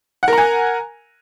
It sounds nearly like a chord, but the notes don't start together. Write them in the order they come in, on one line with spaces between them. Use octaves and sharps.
F#5 A#4 A#5 G#5